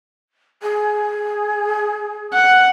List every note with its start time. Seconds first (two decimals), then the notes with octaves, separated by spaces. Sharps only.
0.62 G#4
2.34 F#5